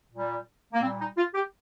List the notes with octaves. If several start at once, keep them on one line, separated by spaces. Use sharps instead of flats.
A#2 G3
A#3
A#2 G3 C4
D#4
F4
G4